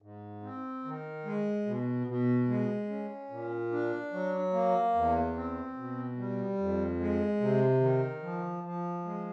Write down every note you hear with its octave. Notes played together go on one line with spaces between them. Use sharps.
G#2
C4
D#3
G#3
B2
B2
G#3
C#4
A#2
D4
F#3
A#3
E2
C4
B2
G3
F2
G#3
C3
D#3
F3
F3
G#3